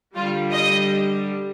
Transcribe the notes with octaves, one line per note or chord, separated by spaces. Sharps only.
D3 G3 F4
D#5